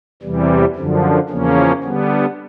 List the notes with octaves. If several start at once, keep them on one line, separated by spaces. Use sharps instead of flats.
E2 C3 E3 G3
F#2 D3 F3
E2 C#3 F3 A#3 C#4
D3 G3 B3